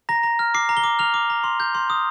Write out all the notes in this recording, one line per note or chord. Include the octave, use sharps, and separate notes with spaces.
A#5 A#6
A#5
F6
D6 C7
A#5
G7
D6
F6 F7
D6
A#5
C6
G6
C6
D#6